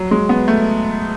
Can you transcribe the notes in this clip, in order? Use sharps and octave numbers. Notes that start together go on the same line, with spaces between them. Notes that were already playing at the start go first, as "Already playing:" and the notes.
Already playing: F#3
G#3
B3
A3